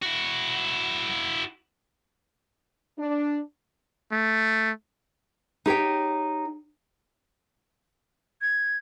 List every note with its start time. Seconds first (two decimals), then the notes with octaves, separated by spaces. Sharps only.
0.02 E4 F#4
2.99 D4
4.12 A3
5.66 D#4 G4 C#5 G5
8.42 G#6